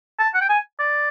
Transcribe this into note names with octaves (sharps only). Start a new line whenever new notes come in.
A5
F#5
G5
G#5
D5